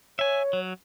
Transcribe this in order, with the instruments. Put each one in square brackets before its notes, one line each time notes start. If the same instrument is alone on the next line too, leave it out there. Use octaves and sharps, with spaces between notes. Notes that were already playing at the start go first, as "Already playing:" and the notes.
[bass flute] C#5 [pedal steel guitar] E5 G#5
[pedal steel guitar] F#3